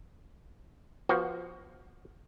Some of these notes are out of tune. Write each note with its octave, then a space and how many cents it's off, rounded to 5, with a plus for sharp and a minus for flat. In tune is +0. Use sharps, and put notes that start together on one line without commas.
F3 +0 B3 -15 F#4 +10